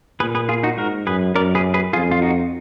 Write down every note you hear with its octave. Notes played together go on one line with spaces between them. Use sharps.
A#2 G#4 B4
G#4 B4
F4 G#4
D#4 F#4
G#2 F#4 A#4
F#2 G#4 B4
F#2 A#4 D5
G#4 B4
G#4 B4
F2 F4 G#4
F4
D#4 F#4